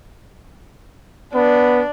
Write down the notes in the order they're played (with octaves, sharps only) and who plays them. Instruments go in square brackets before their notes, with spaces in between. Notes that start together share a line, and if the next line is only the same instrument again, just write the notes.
[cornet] B3 [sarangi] D4